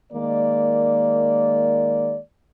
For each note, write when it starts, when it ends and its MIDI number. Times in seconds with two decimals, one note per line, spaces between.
0.13 2.18 51
0.13 2.18 56
0.13 2.18 58
0.13 2.18 74